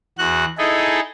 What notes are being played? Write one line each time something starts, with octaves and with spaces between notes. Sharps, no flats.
E2 F#4 F#6
D#4 E4 G#4 A4